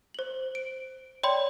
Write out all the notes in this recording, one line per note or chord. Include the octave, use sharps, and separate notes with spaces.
C5 F#7
D7
C#5 D5 G5 B5 C6